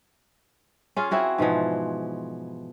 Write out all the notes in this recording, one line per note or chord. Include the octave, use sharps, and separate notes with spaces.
C#4 F4 G#4
C4 E4 F#4 G#4
G#2 B2 E3 F3